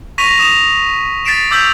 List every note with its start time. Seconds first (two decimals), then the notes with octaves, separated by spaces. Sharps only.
0.18 C#6 A#6 B6 D#7 F7
0.39 D#6 E7 F7
1.25 A6 B6 C7 D7 E7
1.51 D6 E6 G6 B6 F7 F#7